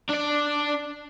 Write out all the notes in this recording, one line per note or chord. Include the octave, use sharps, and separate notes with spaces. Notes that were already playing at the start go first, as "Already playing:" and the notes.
D4 D5